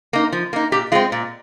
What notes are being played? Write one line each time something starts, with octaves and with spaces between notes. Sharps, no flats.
A#3 D#4
F3
A#3 D#4
A#2 G4
G#3 C4 F4
A#2